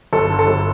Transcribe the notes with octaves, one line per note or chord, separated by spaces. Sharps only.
G1 A4
D3
A4
G1